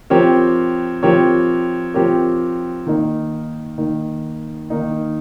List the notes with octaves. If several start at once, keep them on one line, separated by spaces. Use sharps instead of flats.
F3 C4 G4 A#4 C#5
F3 C4 G4 A#4 C#5
F3 C4 G4 A#4 C#5
D#3 A#3 D#4
D#3 A#3 D#4
D#3 A#3 D#4